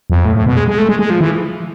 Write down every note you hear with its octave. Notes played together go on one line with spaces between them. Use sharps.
F2
A2
A2
B2
G#3
G#3
A3
G#3
G#3
F3
E3